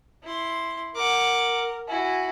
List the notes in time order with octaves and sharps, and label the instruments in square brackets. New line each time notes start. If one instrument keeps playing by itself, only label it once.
[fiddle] E4 C6
[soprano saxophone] A#4 [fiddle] F#5 D6
[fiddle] E4 F#4 [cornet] G#5